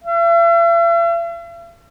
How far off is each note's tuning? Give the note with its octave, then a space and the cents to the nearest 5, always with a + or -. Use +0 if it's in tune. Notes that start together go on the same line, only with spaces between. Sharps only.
E5 +45